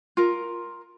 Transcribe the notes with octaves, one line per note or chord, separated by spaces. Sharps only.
F4 A#4